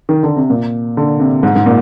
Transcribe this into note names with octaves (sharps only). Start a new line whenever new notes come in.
D#3
D3
C3
A#2
D3
C3
G#2
G#2
A#2